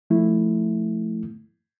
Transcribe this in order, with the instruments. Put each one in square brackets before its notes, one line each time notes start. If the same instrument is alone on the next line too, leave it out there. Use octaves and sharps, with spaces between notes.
[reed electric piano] F3 A3 E4